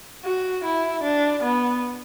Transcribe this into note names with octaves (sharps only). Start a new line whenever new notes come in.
F#4
E4
D4
B3